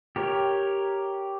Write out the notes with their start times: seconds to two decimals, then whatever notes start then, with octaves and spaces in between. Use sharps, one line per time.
0.16 G4 A#4 C#5